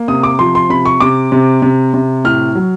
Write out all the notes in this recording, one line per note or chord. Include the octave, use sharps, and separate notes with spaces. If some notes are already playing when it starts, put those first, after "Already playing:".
Already playing: A#3
C3 D#6
D6
F3 C6
C6
C3 B5
C#6
C3 D6
C3
C3
C3
A2 F6
F#3